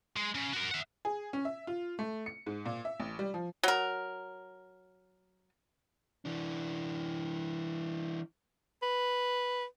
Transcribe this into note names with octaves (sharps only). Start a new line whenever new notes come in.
G#3
C#3
F#4 A#4
E5 F#5
G#4
C#4
E5
F4
A3
C#7
G#2
A#2
E5
A1
G3
F3
F#3 A#4
E3 D4
B4